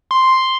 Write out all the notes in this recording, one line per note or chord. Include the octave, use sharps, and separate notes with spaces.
C6